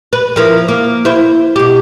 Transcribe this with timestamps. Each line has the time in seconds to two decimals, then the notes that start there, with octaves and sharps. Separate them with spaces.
0.13 B4
0.36 F3 A#3 E4
0.68 A#3
1.05 E4 C5
1.56 B2 G4